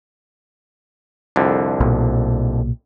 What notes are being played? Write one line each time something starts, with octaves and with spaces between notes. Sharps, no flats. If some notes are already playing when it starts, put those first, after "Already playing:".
C2 F2 D3
B1 A#2